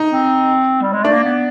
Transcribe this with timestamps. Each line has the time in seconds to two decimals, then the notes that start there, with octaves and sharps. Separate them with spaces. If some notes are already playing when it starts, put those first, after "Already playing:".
Already playing: D#4
0.11 C4
0.82 G3
0.93 G#3
1.03 A3 D4
1.13 A#3
1.24 B3